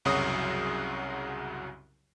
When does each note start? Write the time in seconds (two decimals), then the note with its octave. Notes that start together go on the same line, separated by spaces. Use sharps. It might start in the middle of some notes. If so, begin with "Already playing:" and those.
0.05 C2 F#2 C#3 F#3 F#4 D#6